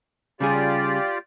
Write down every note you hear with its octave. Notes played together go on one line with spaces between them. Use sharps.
C#3 G3 F4 G4 G#4 D5